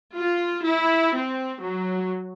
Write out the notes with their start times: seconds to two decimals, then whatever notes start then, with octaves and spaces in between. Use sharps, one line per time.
0.15 F4
0.64 E4
1.17 C4
1.62 F#3